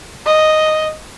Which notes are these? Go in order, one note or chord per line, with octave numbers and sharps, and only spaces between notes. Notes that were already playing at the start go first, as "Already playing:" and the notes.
D#5